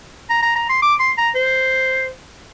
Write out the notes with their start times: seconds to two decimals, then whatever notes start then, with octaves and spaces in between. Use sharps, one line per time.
0.30 A#5
0.42 A#5
0.55 A#5
0.69 C6
0.82 D6
1.00 C6
1.18 A#5
1.35 C5